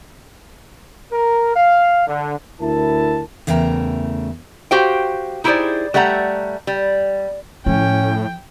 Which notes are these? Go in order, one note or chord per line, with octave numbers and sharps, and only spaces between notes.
A#4
F5
D3
D2 E4 A#4 A5
E2 C#3 A3 A#4 G5 A#5
F#4 G4 C5 F5 G5
D#4 E4 G4 G#4 C5 D5
G3 A3 E5 F#5 A#5
G3
A2 F3 C#4 G5